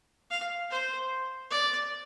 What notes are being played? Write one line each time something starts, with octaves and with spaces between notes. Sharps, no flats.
F5
C5
D5